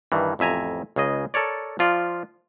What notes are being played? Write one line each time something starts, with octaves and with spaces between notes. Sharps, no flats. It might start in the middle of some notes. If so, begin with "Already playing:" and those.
G2 D#3 E3
A1 F2 E5 G#5 A#5
C#2 C#3 G#4 D#5
A4 A#4 C#5 D5
F3 F4 D5